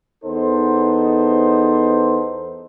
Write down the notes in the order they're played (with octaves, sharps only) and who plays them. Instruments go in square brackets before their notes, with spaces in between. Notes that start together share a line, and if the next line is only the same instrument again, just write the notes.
[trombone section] E2 B3 D#4 A4 C5